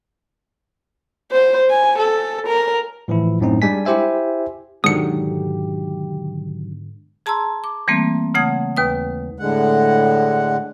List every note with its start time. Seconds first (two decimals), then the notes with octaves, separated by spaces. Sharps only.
1.32 C5
1.70 G#5
1.99 A4
2.47 A#4
3.08 A2 E3 F3 E4
3.41 F#2 A2 C4 D#4
3.62 G3 G#3 D4 G#5 B6
3.85 E4 G4 C5 E5 G#5
4.84 G#2 B2 D3 D#3 F#3 G4 D#6 C#7
7.26 G#4 A5 A#5 C6 E6
7.64 D6
7.88 E3 G3 A3 A#3 C4
8.35 C#3 A3 F#5 D#6 G#6
8.77 D#2 B4 D#6
9.39 A2 D3 G#3 F#5